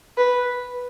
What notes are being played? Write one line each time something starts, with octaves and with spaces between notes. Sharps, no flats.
B4